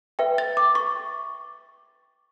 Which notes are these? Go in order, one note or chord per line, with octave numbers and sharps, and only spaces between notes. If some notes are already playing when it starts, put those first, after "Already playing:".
B4 E5 G5
A6
D6
C#6